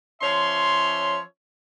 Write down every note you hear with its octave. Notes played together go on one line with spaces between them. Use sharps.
F3 C#4 C#5 E5 C6